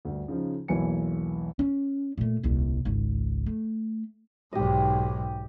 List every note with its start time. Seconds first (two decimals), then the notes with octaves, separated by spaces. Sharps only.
0.05 D2 G2
0.28 C#3 F3 D#4
0.68 B1 E2 E3 A#3 G#5 C#7
1.59 C#4
2.18 A#2 A3
2.43 D#1 C2
2.85 G#1 C#2
3.46 A3
4.53 B1 G#2 G4 D#5